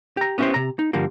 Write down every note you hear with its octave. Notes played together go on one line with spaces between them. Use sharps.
G4 A#5
B3 C#4 E4 F#4 G4 C5
C3 A#5
D#4
G2 D3 F3 G3 A#3